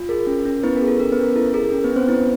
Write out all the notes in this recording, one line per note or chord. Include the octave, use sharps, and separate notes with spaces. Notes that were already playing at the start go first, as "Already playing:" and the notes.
Already playing: F4
G#4 A#4
C#4
C#4
B3 E4 B4
A#4
G#4
A4
C#4 A#4
B3 B4
C#4
A#4
E4 A4
G#4 A#4
C#4
B3 B4
C#4
C4 C5
B3 E4 B4